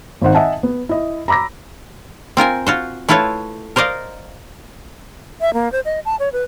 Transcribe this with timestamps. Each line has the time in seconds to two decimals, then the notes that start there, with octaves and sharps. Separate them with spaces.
0.21 G#1 D#3 C5 F#5
0.35 D#5 E5 F#5 G#5 A5
0.63 B3
0.89 E4 D#5
1.28 A#5 B5 D6 E6 A#6
2.37 C4 F4 A#4 G#5
2.67 F4 F#4 C5
3.09 A3 E4 F4 A4 B4 C#5
3.76 A#4 C5 D5 D#5 F5
5.41 E5
5.53 A#3
5.72 C5
5.85 D#5
6.05 A5
6.19 C#5
6.33 B4